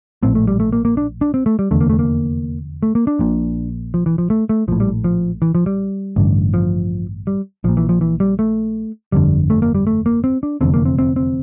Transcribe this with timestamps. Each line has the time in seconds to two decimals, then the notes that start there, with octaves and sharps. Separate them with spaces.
0.23 A#1 A2 C4
0.35 A3
0.48 G3
0.60 A3
0.73 A#3
0.85 A#3
0.97 D4
1.21 D4
1.34 C4
1.46 A3
1.59 G3
1.71 F1 E2 D3 A3
1.81 A#3
1.90 A3
1.99 A#3
2.83 A3
2.95 A#3
3.07 D4
3.19 A#1 A#2
3.94 F3
4.06 E3
4.18 F3
4.30 A3
4.49 A3
4.68 A#1 F3
4.72 A2
4.80 G3
5.04 F3
5.42 E3
5.55 F3
5.66 G3
6.16 A1 G2 D3
6.54 F3
7.27 G3
7.64 A#1 F3
7.69 A#2
7.77 E3
7.89 F3
8.01 E3
8.20 G3
8.39 A3
9.12 G1 F2 D3 G3
9.50 A3
9.62 A#3
9.75 G3
9.87 A3
10.06 A#3
10.24 C4
10.43 D4
10.61 F1 E2 D3 C4
10.74 A#3
10.85 C4
10.99 C4
11.16 C4